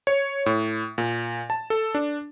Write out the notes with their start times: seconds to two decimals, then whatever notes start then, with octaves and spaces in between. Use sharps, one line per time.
0.07 C#5
0.46 A2
0.98 A#2
1.50 A5
1.70 A4
1.95 D4